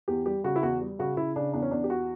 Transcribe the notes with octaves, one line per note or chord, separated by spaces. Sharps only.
E2 G4
G3 G4
C#3 F#4
E4
E2 F#4
G3
C#3 F#4
C#3 E4
C#3 D4
E2 D4
C#4
E2 D4
G4
F#4